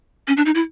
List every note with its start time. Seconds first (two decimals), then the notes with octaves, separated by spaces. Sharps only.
0.28 C#4
0.37 D4
0.46 D#4
0.55 E4